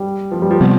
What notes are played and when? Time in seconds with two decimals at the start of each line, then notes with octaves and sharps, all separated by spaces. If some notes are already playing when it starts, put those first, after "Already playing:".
Already playing: G3
0.31 F3
0.42 G3
0.51 F3
0.60 C3 G3 B3